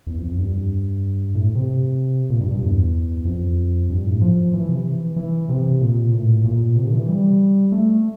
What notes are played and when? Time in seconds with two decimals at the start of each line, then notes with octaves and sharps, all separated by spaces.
0.07 E2
0.18 F2
0.28 F2
0.38 G2
1.35 A2
1.55 C3
2.30 A#2
2.40 G2
2.51 G2
2.62 E2
3.25 F2
3.90 G2
4.05 A2
4.21 F3
4.53 E3
4.69 C3
4.85 E3
5.16 E3
5.49 C3
5.81 A#2
6.13 A2
6.44 A#2
6.76 C3
6.87 D3
6.93 E3
7.08 G3
7.72 A3